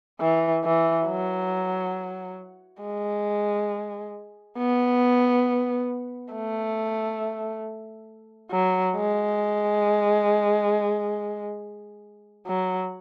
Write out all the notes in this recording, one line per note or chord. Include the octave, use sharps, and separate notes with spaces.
E3
E3
F#3
G#3
B3
A3
F#3
G#3
F#3